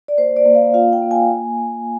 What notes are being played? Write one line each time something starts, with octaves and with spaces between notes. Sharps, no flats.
D5
A#3 C5
D5
A#3
F5
F4 F5
G5
A#3
G#5
A#3
A#3